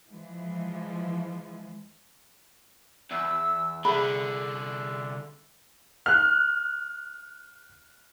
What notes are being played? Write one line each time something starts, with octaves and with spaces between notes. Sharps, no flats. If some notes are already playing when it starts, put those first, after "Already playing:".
E3 F3 G#3
E2 E6
C2 D3 G#4 E5 B5
F6 F#6